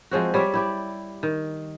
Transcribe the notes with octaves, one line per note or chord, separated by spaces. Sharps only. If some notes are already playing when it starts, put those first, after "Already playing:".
F3 G#3 C4 F#4
G3 C#5 D5 E5
E4 G4 D5
D#3